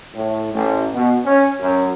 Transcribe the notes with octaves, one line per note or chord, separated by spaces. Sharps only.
A2
A1
B2
C#4
F#2